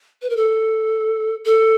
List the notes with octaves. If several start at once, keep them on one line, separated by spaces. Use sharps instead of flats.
B4
A#4
A4
A4